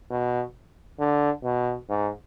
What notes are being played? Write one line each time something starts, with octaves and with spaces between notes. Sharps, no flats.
B2
D3
B2
G#2